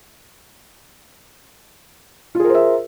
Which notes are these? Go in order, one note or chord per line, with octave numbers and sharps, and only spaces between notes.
F4 G#4 A#4 C5 E5